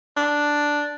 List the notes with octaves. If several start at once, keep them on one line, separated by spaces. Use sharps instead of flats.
D4